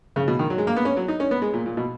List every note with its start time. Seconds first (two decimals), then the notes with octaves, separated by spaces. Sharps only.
0.16 C#3
0.28 B2
0.39 D#3
0.50 F#3
0.58 G#3
0.67 A#3
0.76 B3
0.85 C#4
0.97 F#3
1.08 D#4
1.20 C#4
1.31 B3
1.42 G#3
1.54 A#2
1.66 A#2
1.77 B2